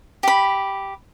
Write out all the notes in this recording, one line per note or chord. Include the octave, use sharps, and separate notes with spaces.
G4 B5